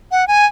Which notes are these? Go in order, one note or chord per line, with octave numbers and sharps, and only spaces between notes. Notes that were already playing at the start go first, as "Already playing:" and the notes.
F#5
G#5